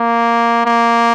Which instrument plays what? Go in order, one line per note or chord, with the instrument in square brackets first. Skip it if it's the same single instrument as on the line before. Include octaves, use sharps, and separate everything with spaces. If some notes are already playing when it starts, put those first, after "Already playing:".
Already playing: [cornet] A#3
A#3